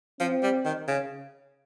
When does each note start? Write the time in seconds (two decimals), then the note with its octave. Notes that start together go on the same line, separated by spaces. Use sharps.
0.20 F3 C4
0.43 G3
0.65 D#3
0.88 C#3